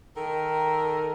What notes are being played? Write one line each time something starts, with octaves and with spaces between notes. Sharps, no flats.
D#3 A4 A#4